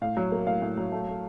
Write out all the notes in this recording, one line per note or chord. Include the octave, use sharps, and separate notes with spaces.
A2 F5
F#3
A#3
A2 F5
A2
F#3
A3
A3